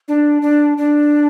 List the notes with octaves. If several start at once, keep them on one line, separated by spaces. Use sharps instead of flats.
D4
D4
D4